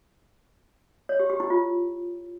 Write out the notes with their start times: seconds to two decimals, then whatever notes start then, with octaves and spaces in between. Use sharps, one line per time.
1.09 C#5
1.19 G4
1.30 G4
1.40 E4
1.50 F4